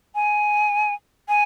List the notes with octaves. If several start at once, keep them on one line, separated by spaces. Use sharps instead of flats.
G#5
G#5